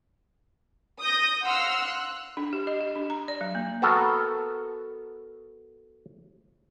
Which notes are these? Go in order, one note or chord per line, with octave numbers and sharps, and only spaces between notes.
D#6 G6 A#6
F5 F#5 C6 E6 F6
F#6
D4
G4
D#5
G4
D4
A#5
D5
F#3
A#3
B3 F#4 A4 A#4